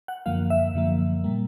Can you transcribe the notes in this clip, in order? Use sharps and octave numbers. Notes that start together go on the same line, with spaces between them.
F#5
F#2 D3 F3 A#3 F5
E5
F#2 D3 F3 A#3
A#2 G3 A#3